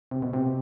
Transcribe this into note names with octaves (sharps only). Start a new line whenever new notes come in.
C3
B2
C3